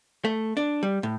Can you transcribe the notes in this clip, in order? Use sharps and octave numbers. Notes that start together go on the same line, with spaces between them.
A3
D4
G3
A2